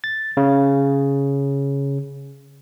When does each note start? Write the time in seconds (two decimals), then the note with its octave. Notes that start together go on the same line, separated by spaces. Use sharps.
0.04 A6
0.37 C#3